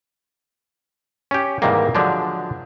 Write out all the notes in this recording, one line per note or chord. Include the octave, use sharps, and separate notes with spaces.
C#4 G4
G#2 C3 D#3 E3 G3 A#3
D3 F3 F#3 G#3 D4